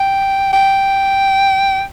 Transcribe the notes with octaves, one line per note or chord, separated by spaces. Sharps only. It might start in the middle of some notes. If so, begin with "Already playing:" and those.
Already playing: G5
G5